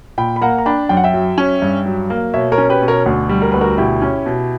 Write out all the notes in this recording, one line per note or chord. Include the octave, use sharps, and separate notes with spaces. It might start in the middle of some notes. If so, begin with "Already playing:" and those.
A#2 G5 B5
B5
A#3 F#5 A#5
A#5
D4 G5 B5
F#2 G5
F#5
E5 G5
F#3
C#4
G2
F#3
A#3
B2 C#5 E5
A#4 C#5
C#4
G4 B4
B2
A#4 C#5
D2
G3
A#4
D2 B4
F#4 A#4
B2 E4 G4
C#4
B2